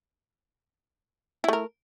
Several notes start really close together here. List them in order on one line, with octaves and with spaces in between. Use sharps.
E4 A3 A#4